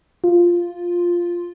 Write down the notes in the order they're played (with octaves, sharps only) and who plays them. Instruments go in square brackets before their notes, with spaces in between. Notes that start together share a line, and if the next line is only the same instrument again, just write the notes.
[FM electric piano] F4